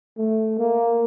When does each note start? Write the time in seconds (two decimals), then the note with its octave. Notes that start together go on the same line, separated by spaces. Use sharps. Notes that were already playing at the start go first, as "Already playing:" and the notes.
0.18 A3
0.59 A#3